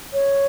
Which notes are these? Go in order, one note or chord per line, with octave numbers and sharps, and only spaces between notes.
C#5